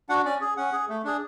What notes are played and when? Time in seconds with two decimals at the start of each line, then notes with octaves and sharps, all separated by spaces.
0.09 D4 F#4 F#5
0.25 C#4 D5
0.41 G#4
0.57 C#4 F#5
0.73 G#4
0.89 A3
1.04 D4 G#4